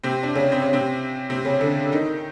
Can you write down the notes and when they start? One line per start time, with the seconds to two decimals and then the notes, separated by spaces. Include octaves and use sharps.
0.03 C3 C4
0.23 D4
0.35 C#3 C#4
0.52 C4
0.62 C#4
0.73 C3 C4
1.30 C3 C4
1.45 C#3 C#4
1.61 D3 D4
1.92 D#3 D#4